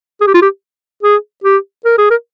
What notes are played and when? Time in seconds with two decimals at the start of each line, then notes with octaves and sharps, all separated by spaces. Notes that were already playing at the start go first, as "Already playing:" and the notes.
0.21 G#4
0.27 G4
0.34 F4
0.42 G4
1.03 G#4
1.44 G4
1.86 A#4
1.98 G#4
2.11 A#4